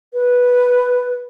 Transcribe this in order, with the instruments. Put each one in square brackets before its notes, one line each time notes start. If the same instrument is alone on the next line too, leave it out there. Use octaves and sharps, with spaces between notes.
[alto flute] B4